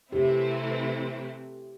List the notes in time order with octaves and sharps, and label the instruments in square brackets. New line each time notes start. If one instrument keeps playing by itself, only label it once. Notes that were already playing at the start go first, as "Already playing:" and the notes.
[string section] C3 E3 A3 C4 E4 [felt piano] G4